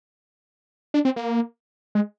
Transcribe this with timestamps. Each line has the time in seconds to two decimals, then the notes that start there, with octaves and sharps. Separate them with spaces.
0.94 D4
1.05 C4
1.16 A#3
1.95 G#3